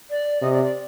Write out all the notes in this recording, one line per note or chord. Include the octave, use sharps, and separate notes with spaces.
D5
C3 D#5
D5
D5